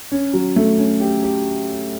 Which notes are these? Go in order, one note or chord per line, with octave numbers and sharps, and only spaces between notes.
C#4
F#3
A3
C#4
G4
G4